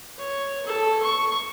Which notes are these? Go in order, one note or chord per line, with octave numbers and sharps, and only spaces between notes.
C#5
A4
C#6